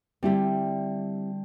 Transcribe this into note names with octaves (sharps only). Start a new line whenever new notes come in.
D3 G3 C4 E4 G4